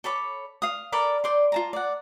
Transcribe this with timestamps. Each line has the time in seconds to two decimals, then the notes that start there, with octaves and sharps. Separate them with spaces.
0.04 A4 C#5 B5 D6
0.62 F5 D#6
0.92 A4 A#4 D5 B5
1.24 C5 D5 C6
1.52 F4 A5 A#5
1.73 D5 F#5